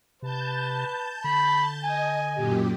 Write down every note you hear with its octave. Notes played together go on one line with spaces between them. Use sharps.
C3 B4 A5 G6
D3 B5
D#5 G#5
F#2 A#2 G4